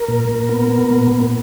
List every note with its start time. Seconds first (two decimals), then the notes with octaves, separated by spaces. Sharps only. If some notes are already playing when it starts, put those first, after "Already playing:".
Already playing: A#4
0.08 A#2
0.29 A#2
0.49 B3
0.70 B3
0.90 A#2
1.11 A#2